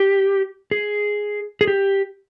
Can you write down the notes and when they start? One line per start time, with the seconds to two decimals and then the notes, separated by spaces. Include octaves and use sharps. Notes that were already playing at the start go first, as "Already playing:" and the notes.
Already playing: G4
0.71 G#4
1.61 G#4
1.67 G4